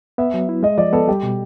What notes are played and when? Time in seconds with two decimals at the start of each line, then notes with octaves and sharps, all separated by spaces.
0.18 B3 E5
0.34 F#3
0.49 E4
0.63 G#3 D#5
0.78 F3 D5
0.93 B3 A4
1.08 G3 G4
1.23 B2